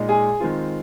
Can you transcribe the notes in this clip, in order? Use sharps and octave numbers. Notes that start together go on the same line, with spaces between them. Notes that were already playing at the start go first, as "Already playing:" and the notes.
Already playing: A#2 G#3 D#4
G#4 G#5
D#3 G#3 C4 F4